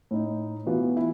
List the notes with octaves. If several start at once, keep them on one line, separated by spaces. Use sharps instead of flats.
A2 D#4
B2 E3 B3 F4 F#4
E4